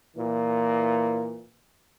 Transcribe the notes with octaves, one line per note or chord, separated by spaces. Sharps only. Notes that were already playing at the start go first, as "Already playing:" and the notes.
A#2 E3